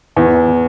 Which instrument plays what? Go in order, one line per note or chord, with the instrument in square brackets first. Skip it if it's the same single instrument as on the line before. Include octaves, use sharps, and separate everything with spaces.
[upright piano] E2